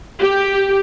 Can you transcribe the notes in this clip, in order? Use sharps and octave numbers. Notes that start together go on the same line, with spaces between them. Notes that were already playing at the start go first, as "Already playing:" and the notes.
G4